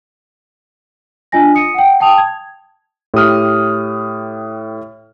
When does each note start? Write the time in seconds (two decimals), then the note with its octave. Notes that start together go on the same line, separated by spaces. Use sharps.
1.32 D4 F4 D#5 G#5 A#6
1.55 D#6 C#7 D#7
1.74 F#5 G5
2.00 G5 A5 D#6 F7
2.18 G#6
3.14 A2 G4 D#6 F6